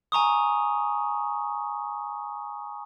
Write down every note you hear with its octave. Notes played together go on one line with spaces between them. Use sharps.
G#5 A#5 C#6 D#6